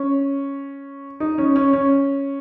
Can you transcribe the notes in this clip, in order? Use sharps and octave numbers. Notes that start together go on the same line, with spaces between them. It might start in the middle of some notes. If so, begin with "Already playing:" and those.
Already playing: C#4
D#4
C#4
C#4
C#4